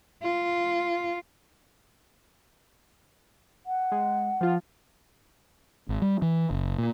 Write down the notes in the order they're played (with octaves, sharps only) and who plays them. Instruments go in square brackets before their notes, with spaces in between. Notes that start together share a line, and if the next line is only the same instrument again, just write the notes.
[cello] F4
[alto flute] F#5
[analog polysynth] G#3
F3 F4
[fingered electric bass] G#1
G3
E3
F#1
A#2